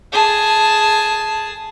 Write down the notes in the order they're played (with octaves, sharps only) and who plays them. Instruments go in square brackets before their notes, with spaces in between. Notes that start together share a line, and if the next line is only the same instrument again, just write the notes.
[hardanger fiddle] G#4 A5